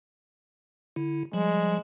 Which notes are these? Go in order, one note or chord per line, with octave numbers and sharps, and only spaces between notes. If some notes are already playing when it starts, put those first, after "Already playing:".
D3 E4
F3 G3 G#3